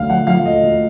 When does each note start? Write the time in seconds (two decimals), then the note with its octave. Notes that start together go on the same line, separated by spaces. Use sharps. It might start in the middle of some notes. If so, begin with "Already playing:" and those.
Already playing: D2 D3 F5
0.09 F3 F#5
0.27 F3 F5
0.45 D2 D#5
0.63 D2